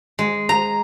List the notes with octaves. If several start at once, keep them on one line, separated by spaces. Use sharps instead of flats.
G#3
A#5